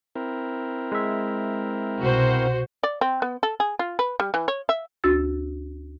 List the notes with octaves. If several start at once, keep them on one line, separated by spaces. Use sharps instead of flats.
C4 E4 A#4
G#3 E5
C2 B2 F#4 C5
D5
C4
B3
A4
G#4
F4
B4
G3
E3
C#5
E5
D2 D4 F#4 E6 A6